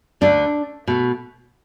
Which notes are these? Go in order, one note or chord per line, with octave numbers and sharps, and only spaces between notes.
D2 D3 A3 D4
B2 A3